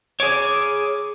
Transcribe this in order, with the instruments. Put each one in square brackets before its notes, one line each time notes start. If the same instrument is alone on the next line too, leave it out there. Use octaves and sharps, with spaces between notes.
[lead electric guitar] G#4 C#5 [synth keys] D6